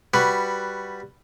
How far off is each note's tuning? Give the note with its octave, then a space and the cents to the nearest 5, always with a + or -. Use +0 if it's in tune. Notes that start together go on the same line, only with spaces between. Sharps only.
G3 +0 F#4 +0 B4 +0